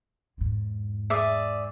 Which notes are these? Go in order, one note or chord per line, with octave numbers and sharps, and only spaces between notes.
E2 G#2
G#4 D5 E5